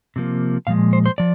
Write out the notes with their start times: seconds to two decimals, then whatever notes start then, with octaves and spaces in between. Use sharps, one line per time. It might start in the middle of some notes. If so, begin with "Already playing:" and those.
0.16 C3 F3 A#3
0.67 A#2 F3 G#3 F5
0.93 C5
1.06 C5
1.18 F3 D5